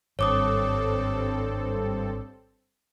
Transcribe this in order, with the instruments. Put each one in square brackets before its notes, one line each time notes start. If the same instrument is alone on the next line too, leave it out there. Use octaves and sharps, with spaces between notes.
[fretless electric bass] G#1 [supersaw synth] G2 C4 A4 [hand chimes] C#5 D6 D#6